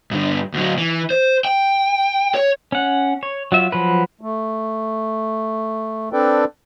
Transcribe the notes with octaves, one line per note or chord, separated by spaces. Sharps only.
G2 D3
D2 F#3
E3
C5
G5
C#5
C#4 F#5
C#5
F#3 F4 E5
F3 F#3 B4
A3
C4 D4 A4 B4 D5 G5